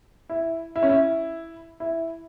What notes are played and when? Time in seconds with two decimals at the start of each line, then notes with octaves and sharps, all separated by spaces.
0.29 E4
0.76 E4
0.83 C#4
0.90 E4
1.80 E4